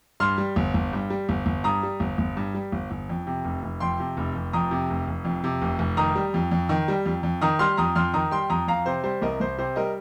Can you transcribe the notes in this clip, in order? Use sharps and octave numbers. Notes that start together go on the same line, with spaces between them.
G2 C6 F6
G3
G1
G1
G2
G3
G1
G1
G2 A#5 D#6
G3
G1
G1
G2
G3
G1
G1
F2
C3
F1
F1
F2 G5 C6
C3
F1
F1
F2 A#5 D#6
C3
F1
F1
F2
C3
F1
F1
D#3 A#5 D#6
G3
F2
F2
D#3
G3
F2
F2
D#3 A#5 D#6
G3 C6 F6
F2 A#5 D#6
F2 C6 F6
D#3 A#5 D#6
G3 G5 C6
F2 A#5 D#6
F2 F5 A#5
C3 C5
G3 C5
C2 A#4 D#5
C2 C5
C3 C5
G3 A#4 D#5